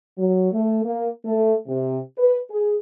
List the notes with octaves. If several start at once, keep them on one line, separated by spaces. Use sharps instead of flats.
F#3
A3
A#3
A3
C3
B4
G#4